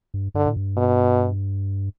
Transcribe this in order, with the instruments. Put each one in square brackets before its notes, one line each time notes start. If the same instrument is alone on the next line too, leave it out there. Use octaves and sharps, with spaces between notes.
[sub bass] G2
[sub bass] G2 [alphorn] D3
[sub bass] A2
G2
[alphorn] B2